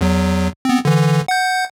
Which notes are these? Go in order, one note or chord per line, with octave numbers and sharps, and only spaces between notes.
E2 F#3
B3 C4
D3 E3
F#5 G6